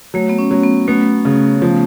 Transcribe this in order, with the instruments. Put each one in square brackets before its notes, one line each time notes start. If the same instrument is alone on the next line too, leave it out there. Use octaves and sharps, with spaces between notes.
[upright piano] F#3 [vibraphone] A3
[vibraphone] B3
C#4
[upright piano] F#3
[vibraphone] B3
[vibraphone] A3 [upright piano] B3
[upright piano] C#3
F3